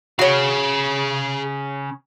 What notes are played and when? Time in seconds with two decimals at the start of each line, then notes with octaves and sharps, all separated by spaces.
0.19 C#3 F#4 G#4 C#5 F5